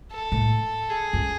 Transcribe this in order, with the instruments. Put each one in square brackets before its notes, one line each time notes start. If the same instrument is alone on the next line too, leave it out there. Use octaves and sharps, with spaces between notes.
[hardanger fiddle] A4
[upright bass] A2
[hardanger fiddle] G#4
[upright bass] F#2